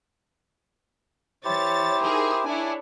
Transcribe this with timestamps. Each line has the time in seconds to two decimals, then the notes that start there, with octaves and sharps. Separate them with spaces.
1.45 E3 E4 G4 C5 C#5 A6
2.02 D#4 G#4 A#4
2.45 D4 E4 C#5 G#5